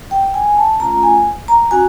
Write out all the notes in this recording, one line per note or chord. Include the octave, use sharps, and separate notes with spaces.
G5
G#5
A5
A3 C#4 F4 A#5
G#5
A#5
C#4 F#4 G#5